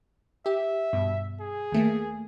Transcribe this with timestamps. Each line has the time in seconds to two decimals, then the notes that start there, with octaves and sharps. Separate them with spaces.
0.46 G4 E5
0.93 G2 B2
1.40 G#4
1.72 D#2 A3 A#3